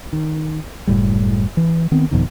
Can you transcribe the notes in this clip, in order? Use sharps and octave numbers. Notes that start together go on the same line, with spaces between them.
D#3
F#1 A2 G3
E3
D#3 B3 C4
G1 F2 B2 D#3